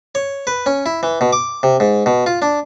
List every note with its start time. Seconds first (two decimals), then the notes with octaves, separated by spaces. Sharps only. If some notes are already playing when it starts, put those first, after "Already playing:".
0.15 C#5
0.47 B4
0.66 C#4
0.86 E4
1.03 E3
1.21 B2
1.33 D6
1.63 C3
1.80 G#2
2.06 B2
2.26 F4
2.42 D4